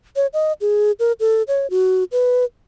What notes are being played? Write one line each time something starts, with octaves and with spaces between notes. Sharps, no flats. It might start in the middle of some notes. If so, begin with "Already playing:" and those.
C#5
D#5
G#4
A#4
A4
C#5
F#4
B4